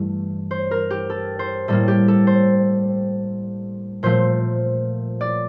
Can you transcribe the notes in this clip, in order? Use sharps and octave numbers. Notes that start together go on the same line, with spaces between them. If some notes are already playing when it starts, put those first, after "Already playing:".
Already playing: G2 E3 A3
C5
A#4
G4
A4
C5
A2 G3 A#3 A4
G4
A4
C5
A#2 F3 A3 C5
D5